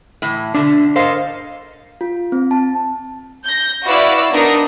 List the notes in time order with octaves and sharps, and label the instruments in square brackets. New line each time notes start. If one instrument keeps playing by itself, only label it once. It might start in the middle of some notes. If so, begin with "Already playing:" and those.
[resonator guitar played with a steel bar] A2 E3
[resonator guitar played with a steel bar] B2 D3 A3 [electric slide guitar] D4
[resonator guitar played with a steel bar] A4 A#4 F5 [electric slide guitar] C5 D#5
[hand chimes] F4
C4
A5
[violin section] G6 A#6
E4 F#4 B4 D5 F5 E6
B3 D4 D#4 A#4 D#5